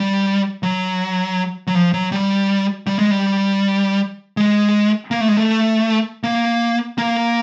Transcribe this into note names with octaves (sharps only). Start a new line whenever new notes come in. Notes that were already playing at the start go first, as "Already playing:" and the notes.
Already playing: G3
F#3
F#3
F3
F#3
G3
G3
G#3
G3
G#3
A#3
A3
G#3
A3
A#3
A#3